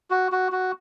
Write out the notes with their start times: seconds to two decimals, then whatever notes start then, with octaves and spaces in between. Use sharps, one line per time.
0.11 F#4
0.32 F#4
0.52 F#4